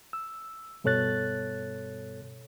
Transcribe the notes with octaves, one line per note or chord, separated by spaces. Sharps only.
E6
G2 B2 A4 C#5 F#6 A6